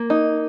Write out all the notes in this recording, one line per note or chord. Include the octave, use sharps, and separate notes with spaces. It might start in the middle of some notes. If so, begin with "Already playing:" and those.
Already playing: A#3
D#4